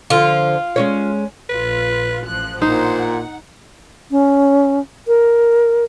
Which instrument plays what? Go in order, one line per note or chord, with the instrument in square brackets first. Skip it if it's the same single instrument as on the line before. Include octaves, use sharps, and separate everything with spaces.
[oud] D3 F3 [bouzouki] F4
[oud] G#3 C#4 C#5
[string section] A#1 F4 [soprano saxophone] B4
[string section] A1 F3 F#6
[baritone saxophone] A#2 [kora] D#4 [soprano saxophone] C5 [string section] F#5
[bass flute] C#4
A#4